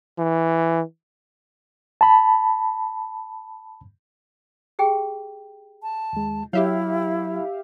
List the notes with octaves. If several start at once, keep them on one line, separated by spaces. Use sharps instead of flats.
E3
A5 B5
G4 G#4 G5
A5
D#2 G#3
F#3 E4 G4 C#5 E5 F5